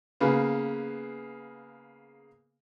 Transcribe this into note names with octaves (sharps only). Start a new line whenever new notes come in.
C#3 A#3 B3